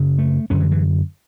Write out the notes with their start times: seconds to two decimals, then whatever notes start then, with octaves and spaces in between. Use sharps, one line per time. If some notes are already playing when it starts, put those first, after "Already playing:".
Already playing: F#2 C#3
0.18 A3
0.50 F#2 D3 C#4
0.60 E3
0.71 E3